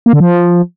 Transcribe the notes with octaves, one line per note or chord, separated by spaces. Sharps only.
A#3
D3
F3